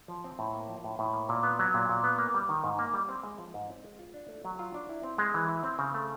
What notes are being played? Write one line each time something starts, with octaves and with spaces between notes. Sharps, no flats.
F3
C4
A2
A#3
F3
A2
A2
A#3
A#2
B3
F#3
A#2
A#2
B3
A#3
G3
D#3
G#2
A#3
G3
C4
G#3
F3
G#2
C4
G#3
F4
D4
A3
F#3
F4
D4
E4
C4
G#3
E3
E4
C4
C#3
A3